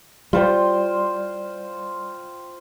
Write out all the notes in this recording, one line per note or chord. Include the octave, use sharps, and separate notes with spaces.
G3 F4 C5 G5